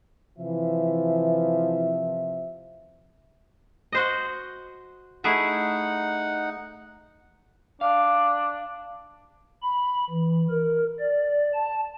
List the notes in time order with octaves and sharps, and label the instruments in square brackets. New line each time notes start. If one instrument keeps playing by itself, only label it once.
[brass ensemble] C3 F3 E5 [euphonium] E3
[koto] F#4 C5 D#5
[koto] A3 E4 G#4 [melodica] D#4 F#5
[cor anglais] D4 [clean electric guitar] F5
[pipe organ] B5
E3
A#4
D5
A5